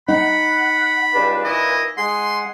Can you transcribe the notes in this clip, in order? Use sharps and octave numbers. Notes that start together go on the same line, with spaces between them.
D#4 F#5 B5
C#2 G2 D4 B4
A#2 E3 E4 D#5
G#3 G#4 F#5 C6